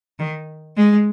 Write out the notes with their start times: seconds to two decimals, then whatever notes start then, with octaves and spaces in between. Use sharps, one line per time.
0.19 D#3
0.77 G#3